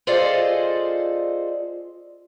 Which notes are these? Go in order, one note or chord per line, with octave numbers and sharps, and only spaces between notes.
F4 G#4 A4 C5 D5 D#5